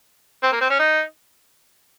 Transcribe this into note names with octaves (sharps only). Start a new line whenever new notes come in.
C4
A#3
C4
C#4
D#4